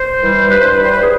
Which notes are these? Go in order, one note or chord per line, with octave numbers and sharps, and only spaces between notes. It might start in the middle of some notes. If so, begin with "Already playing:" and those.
Already playing: C5
E3 G3
G2 B4
C5
B4
E3 G3 C5
B4
G#4